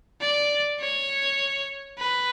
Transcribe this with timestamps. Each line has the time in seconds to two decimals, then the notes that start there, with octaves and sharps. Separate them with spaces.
0.21 D5
0.80 C#5
1.99 B4